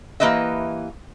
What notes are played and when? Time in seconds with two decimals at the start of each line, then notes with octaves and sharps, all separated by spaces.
0.20 E3 A#3 G4 B4 D#5 E5